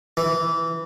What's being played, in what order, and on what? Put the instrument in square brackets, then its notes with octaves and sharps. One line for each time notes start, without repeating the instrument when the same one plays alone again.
[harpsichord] E3